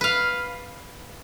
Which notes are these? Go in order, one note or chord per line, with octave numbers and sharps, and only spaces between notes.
B4 F5